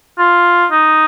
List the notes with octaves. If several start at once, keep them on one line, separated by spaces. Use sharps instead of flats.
F4
D#4